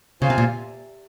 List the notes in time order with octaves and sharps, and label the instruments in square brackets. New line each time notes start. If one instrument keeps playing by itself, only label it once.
[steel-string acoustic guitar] C#3 [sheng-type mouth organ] F4 C5 F5 G#5
[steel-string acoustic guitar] C3
A#2